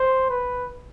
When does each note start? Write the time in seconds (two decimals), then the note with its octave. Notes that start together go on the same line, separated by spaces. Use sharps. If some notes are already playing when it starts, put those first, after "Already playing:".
Already playing: C5
0.30 B4